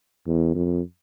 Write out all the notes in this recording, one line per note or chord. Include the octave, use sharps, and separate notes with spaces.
E2
F2